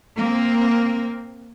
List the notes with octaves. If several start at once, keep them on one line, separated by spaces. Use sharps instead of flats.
A#3 C4